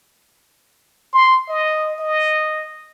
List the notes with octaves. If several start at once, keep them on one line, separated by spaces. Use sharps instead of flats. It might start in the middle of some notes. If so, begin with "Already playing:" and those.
C6
D#5
D#5